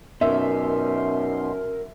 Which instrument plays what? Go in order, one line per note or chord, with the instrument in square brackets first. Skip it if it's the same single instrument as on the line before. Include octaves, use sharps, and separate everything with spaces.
[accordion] F#2 B2 C6 [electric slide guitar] C#4 D#4 [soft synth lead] A#4 [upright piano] E5